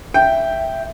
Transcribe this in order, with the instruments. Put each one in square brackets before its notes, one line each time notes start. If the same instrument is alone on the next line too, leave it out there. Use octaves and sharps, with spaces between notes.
[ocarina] E5 [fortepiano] G5